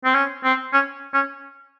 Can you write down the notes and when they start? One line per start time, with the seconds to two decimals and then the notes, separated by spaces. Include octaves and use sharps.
0.05 C4
0.15 C#4
0.44 C4
0.73 C#4
1.14 C#4